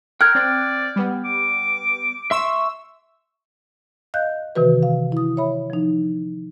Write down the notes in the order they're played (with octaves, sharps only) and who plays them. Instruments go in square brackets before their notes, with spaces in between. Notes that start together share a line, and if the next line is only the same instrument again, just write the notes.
[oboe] A#4 [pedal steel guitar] G5 F#6 [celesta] F6 G#6
[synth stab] C4 [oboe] D5
[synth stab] G3 B3
[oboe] D6
[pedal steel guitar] E5 C6 C#6 [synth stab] E6
[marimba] D#5 F5 F#6 G6
C3 D#3 E3 F#4 B4
F5
E4 D#6
C#5 E5 B5
F3 D#4